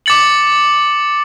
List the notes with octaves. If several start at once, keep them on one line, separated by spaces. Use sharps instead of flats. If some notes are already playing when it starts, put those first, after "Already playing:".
D6 A6 C#7 F#7